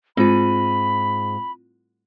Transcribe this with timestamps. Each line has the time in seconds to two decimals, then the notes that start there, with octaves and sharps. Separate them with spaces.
0.17 G#2 C4 F4 B5